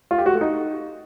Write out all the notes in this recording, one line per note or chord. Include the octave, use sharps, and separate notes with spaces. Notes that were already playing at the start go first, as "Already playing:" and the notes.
F4
G4
F#4
A3
D#4